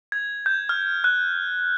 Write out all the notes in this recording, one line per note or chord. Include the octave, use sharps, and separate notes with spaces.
G#6
G6
F6
F#6